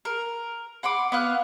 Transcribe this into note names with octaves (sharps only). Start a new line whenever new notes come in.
A#4
F#5 B5 C6 D6
B3 F5 F#6